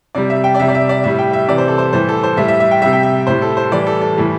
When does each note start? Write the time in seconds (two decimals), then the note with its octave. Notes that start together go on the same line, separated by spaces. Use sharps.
0.15 C3 G3 D5
0.30 E5
0.44 G5
0.55 D5
0.60 C3 G3 E5
0.68 D5
0.75 E5
0.89 D5
1.04 A2 G3 E5
1.19 G5
1.33 E5
1.48 C3 E3 G3 D5
1.58 C5
1.68 A4
1.78 C5
1.93 A2 E3 G3 C5
2.09 A4
2.23 C5
2.37 A2 G3 E5
2.48 E5
2.60 E5
2.71 G5
2.82 C3 G3 E5
2.93 G5
3.03 E5
3.27 A2 G3 C5
3.42 A4
3.57 C5
3.71 A2 E3 G3 D5
3.87 A4
4.01 A4
4.17 A2 E3 G3